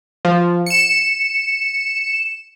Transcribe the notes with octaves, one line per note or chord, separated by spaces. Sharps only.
F3
C#7 E7